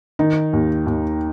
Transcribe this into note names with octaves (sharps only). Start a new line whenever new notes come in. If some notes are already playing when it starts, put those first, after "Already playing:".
D#3 D#4
D#2
D#2